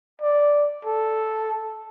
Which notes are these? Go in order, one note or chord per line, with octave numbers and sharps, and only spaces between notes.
D5
A4